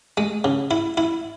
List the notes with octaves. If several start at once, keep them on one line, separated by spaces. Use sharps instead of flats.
G#3
C#3
E4
E4